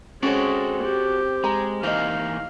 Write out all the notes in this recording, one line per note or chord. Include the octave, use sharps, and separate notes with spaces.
G#3 C4 C#4 F#4 A4 C#5 D5
G4
G#3 A#5
E3 A#3 D#4 C5 D#5 F5